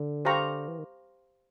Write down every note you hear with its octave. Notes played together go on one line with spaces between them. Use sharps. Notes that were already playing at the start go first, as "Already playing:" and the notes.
Already playing: D3
G4 C5 F5 A#5 C#6
E3
D#3